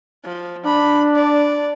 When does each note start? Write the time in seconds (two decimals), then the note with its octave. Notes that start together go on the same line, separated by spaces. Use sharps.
0.25 F3
0.66 D4 B5
1.15 D5